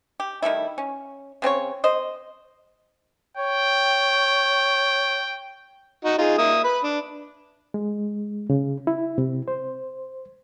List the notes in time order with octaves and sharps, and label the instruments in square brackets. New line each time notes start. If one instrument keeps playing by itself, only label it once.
[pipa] G4
D#3 G3 A3 E4
C#4
C#3 C4 F#4 C#5
C5 D#5
[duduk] C#5 [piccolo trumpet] G5
[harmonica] D#4 F#4
D#4 F4 G#4
A#3 E5 D#6
B4 B5
D4
[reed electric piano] G#3
C#3
E4
C3
C5